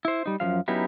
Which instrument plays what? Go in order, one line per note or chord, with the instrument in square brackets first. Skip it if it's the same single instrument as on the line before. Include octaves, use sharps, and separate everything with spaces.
[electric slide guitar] E4 C5
G3 D#4
F#2 D#3 F3 F5
F#3 B3 C#4 D#4 E4 G4